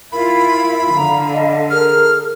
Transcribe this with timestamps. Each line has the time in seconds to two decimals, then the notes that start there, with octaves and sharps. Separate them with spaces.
0.12 E4 F4 A#4 B5
0.95 D3 F5 A#5
1.33 D#5
1.70 G#4 A#4 F6